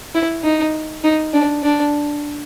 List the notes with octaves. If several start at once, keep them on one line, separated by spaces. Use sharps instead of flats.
E4
D#4
D#4
D4
D4